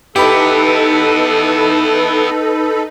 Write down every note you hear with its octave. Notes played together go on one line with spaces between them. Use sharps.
B3 D#4 E4 G4 A4 B4 B5